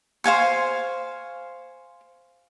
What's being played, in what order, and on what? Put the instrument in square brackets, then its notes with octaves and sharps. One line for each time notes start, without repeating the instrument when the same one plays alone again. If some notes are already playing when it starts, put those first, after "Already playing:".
[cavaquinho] C5 F5 G#5 C#6